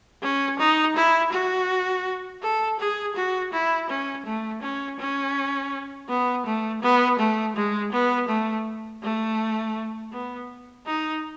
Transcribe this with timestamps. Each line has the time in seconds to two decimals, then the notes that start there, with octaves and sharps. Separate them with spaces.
0.22 C#4
0.59 D#4
0.96 E4
1.32 F#4
2.42 A4
2.79 G#4
3.16 F#4
3.53 E4
3.89 C#4
4.26 A3
4.62 C#4
5.00 C#4
6.09 B3
6.46 A3
6.82 B3
7.19 A3
7.56 G#3
7.92 B3
8.29 A3
9.02 A3
10.12 B3
10.86 D#4